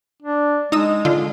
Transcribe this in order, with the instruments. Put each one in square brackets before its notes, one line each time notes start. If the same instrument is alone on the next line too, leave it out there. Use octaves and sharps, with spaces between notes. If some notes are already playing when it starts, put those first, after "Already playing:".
[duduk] D4
[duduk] G#3 [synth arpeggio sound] D#4 D#6 E6
[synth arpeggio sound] D3 F4